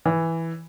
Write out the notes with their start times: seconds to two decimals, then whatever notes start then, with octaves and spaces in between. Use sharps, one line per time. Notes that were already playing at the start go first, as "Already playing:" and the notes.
0.06 E3